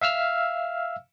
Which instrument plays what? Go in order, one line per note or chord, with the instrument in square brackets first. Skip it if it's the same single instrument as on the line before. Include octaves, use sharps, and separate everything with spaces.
[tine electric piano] E5 F5 E6 F6